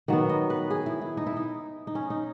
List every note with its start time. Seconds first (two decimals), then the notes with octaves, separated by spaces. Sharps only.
0.08 D#3 F#3 B3
0.29 D#5
0.50 B4
0.70 G#4
0.86 E4
1.01 E4
1.17 D#4
1.26 E4
1.37 D#4
1.87 D#4
1.95 C#4
2.10 D#4